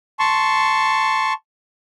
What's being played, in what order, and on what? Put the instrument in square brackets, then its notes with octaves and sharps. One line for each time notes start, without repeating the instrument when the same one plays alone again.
[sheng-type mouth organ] A5 C6 C#6